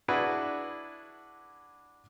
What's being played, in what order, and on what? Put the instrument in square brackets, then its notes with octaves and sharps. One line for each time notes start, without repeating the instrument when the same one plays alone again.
[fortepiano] D4 E4 F#4 G#4 B4